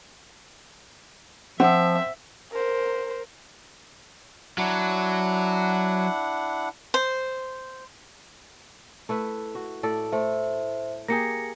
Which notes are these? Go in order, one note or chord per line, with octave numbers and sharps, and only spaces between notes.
F3 C4 E5 F#5
A#4 C5
F#3 D4 E4 F#5
C5
A3 E4 B4
F#4
A2 A4 D5
A3 C5 E5
A#3 G4 G#4 A#6 C#7